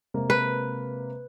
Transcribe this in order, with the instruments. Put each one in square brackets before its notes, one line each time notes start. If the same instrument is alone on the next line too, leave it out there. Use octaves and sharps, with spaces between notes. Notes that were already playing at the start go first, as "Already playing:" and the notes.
[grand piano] C3 G#3 A#3
[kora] B4